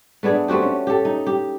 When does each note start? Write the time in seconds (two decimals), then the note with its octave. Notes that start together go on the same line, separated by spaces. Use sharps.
0.23 A3 B3 D4 G#4
0.48 A3 C4 F#4 G4
0.62 C#4
0.87 G4 A4
1.05 D#4
1.27 G4